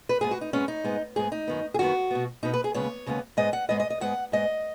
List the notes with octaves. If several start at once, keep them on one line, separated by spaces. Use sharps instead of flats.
B4
G#2 G#3 B3 G#4
F#4
D#4
G#2 G#3 B3 C#4
D#4
G#2 G#3 B3
G#2 G#3 B3 G#4
D#4
F#2 D#3 B3
G#4
F#2 D#3 B3 F#4
B2 B3
B2 B3 D#4
B4
G#4
D#2 C#3 G#3 B3 C#5
D#2 C#3 G#3 B3
G#2 G#3 B3 D#5
F#5
G#2 G#3 B3 D#5
D#5
D#5
G#2 G#3 B3 F#5
G#2 G#3 B3 D#5